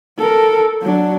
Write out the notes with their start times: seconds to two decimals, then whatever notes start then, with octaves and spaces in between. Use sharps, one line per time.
0.18 A4 A#4
0.82 F#3 D4